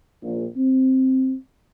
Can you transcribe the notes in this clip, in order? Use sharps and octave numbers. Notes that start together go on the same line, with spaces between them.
A#1
C4